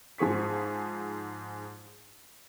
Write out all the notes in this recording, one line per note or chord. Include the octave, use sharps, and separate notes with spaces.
G#2 F3 G#4 C#6 B6